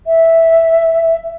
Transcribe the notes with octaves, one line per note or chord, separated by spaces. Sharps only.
E5